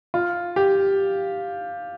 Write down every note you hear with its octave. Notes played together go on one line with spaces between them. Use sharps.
F4
G4